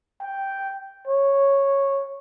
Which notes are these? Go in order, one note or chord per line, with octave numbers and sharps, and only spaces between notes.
G5
C#5